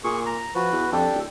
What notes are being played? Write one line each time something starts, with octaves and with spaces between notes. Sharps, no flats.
A#2 G#4 C#6
A#5
F3 F#4 B4
E2
F2 D4 G4 A4
D1